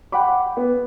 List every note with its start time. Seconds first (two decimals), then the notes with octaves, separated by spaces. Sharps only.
0.12 F#5 G5 B5 D6
0.57 B3